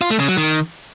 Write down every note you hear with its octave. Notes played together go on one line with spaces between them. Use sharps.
F4
A3
C#3
F#3
D#3